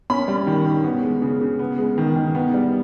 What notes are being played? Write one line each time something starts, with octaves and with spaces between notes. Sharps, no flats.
C#4 B5
G3
D#3
D#3
B3
G#3
C#3
C#3
B3
G#3
D#3
D#3
B3
G3